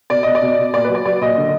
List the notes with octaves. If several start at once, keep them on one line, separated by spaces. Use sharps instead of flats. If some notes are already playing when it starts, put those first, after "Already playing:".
B2 D5
B2 D#5
D5
B2
B2
A#2 D5
F#3 B4
D5
F#3 D5
A#2 D#5
D3